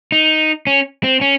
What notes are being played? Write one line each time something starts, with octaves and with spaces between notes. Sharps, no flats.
D#4
C#4
C4
C#4